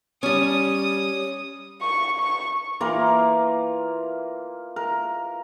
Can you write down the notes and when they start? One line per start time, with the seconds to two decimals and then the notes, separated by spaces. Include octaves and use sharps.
0.23 G3 C#4 D#6
1.82 C#6
2.19 C#6
2.81 E3 A#3 F4 A#4
4.76 A#4